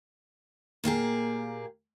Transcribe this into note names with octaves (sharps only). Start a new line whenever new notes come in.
A#2 A#3 G4 G#4